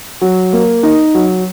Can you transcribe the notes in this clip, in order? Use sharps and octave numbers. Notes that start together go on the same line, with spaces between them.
F#3
A#3
D#4
F#3